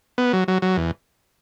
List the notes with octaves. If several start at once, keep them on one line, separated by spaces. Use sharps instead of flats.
B3
F#3
F#3
F#3
E2